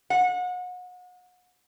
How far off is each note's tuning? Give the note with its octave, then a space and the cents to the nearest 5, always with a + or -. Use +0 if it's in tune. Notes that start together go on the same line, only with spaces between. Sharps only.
F#5 -35